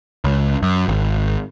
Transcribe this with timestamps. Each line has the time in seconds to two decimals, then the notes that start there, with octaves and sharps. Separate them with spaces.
0.24 C#2
0.62 F#2
0.88 G#1